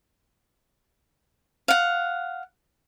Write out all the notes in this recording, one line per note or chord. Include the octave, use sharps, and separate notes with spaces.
F5 F#5